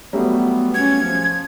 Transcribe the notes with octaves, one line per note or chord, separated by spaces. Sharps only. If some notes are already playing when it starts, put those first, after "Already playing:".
F#3 G3 A3 B3
C#4 G#6
F3